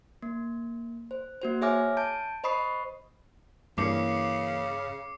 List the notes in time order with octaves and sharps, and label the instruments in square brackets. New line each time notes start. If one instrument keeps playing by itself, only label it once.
[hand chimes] A#3
C5
A#3 F#4 C5
G#4 C#5 E5 G#5 D6 F6
A5 G6 D7
C5 D#5 B5 C#6 D#6 C7
[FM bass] G2 [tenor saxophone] C#3 [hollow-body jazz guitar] E3 A#3 C#4 [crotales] D6 C7 C#7